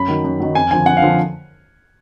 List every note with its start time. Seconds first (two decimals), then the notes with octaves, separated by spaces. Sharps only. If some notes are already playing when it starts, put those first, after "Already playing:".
Already playing: F#2 B5
0.08 D#3 F#3
0.24 F#2
0.40 D#3 F#3
0.55 F2 G#5
0.71 D3 F3 G#5
0.86 F2 F#5
0.97 F5
1.02 D3 F3